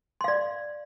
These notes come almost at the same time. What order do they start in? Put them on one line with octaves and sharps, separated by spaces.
C6 F5 D5